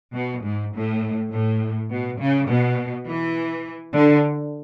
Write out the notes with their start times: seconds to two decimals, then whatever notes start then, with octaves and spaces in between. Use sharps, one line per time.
0.13 B2
0.42 G#2
0.72 A2
1.31 A2
1.89 B2
2.19 C#3
2.48 B2
3.07 E3
3.94 D3